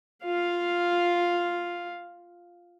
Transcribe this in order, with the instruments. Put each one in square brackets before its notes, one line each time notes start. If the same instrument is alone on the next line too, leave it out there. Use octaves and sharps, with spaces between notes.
[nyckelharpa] F4 F5